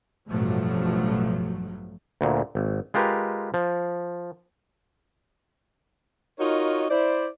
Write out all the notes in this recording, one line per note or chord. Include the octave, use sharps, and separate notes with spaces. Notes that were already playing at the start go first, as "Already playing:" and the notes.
A1 G2 B2 F3 F#3 A3
D2 A#2
G#1
G#3 F4 G4 A#4 B4
F3
D#4 F4 F#4 A#4 C#5 D#5
E4 C5 D5